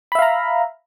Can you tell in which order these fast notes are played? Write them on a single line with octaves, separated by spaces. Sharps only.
B5 E5 F5 A#5